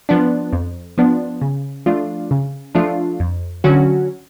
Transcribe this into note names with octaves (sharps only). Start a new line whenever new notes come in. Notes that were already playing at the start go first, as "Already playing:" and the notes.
F3 B3 D4
F2
F3 B3 D4
C#3
F3 A3 D4 F4
C#3
F3 A3 D4 F4
F2
D3 F#3 C#4 F#4